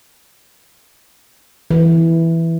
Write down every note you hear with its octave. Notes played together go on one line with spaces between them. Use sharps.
E3